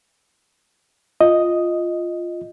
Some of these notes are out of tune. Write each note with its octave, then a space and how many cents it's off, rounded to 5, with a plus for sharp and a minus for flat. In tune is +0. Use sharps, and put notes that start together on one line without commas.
F4 +0 D#5 +0